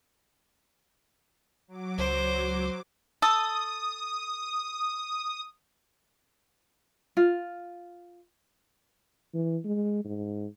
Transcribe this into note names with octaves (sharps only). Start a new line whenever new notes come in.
F#3 D6
C#2 C5
A4 D#6
F4
E3
G#3
G#2